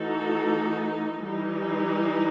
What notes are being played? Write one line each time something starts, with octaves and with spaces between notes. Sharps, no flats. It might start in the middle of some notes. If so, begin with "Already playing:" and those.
Already playing: E3 A3 D#4 F#4 A4
E3 G3 D#4